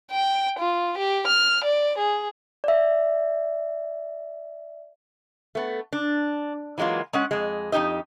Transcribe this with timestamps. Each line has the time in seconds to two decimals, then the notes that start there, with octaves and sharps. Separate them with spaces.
0.11 G5
0.59 F4
0.98 G4
1.27 F6
1.65 D5
1.98 G#4
2.64 D5 E5
5.55 A3 B3
5.93 D4
6.78 E3 F#3 G#3 A#3 F4
7.13 G#3 C#4 F#5
7.31 F2 G#3
7.72 F2 G#2 D#4 G4 D#5